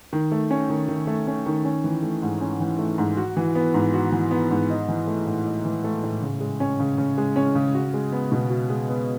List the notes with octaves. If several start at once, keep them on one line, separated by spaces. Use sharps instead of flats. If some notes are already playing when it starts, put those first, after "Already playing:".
D#3
A3
C#4
D#3
D#3
A3
C#4
D#3
C#4
E3
A3
G#2
C#4
E3
A3
G#2
F#4
E3
B3
G#2
F#4
E3
B3
G#2
D#4
E3
A3
A2
D#4
E3
A3
A2
C#3
G#3
C#4
C#3
C#3
G#3
C#4
C#3
F#4
G#3
B3
B2
F#4
G#3
B3